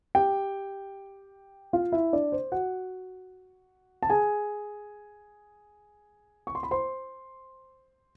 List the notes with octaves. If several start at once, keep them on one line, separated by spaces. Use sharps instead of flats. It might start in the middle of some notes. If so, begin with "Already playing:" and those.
G4 G5
F4 F5
E4 E5
D4 D5
C5
F#4 F#5
A5
G#4 G#5
C#6
C6
B5
C5 C6